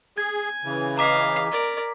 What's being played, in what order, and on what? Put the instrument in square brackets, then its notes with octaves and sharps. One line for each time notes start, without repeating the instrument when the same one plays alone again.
[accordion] G#4 [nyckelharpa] G#5 [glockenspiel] G#6
[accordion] C#3 E3
[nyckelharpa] D#5 F5 [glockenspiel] A#5 D6 B6
[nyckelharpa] A#4 D5